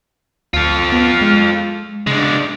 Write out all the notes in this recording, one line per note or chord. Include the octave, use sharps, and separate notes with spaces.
D2 F4 A4
B3
G#3
C#3 G#3 D4